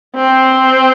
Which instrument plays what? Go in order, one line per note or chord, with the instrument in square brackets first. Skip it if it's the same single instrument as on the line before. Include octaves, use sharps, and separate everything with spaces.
[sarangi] C4